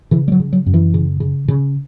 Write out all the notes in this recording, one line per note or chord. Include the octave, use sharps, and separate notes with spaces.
C#3 E3
G3
F#3
C#3
F#3
F#2
E3
C#3
C#3
C#3